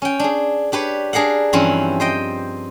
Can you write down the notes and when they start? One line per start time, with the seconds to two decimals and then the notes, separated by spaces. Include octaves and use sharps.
0.02 C#4 G5
0.19 D4 G#4
0.72 D4 G4 B4 C#5
1.13 D4 G#4 A#4 F5 F#5
1.53 G2 E3 F3 C4 C#4 E4
2.00 C5 D#5 G5